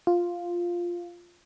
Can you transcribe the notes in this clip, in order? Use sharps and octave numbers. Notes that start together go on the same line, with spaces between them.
F4